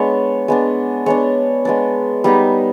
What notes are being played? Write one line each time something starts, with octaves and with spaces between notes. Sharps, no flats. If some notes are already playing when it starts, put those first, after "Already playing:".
Already playing: G#3 B3 D4 C#5
G#3 B3 D4
G#3 B3 D4 C#5
G#3 B3 D4
G3 B3 D#4